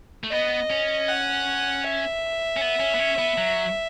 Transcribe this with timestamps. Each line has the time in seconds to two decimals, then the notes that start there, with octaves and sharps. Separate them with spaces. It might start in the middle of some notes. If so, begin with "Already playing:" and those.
0.24 A3
0.32 B3 D#5
0.70 C#4
1.09 F#5
1.84 E5
2.57 C#4
2.61 B3
2.80 C#4
2.95 B3
2.99 C#4
3.19 B3
3.37 F#3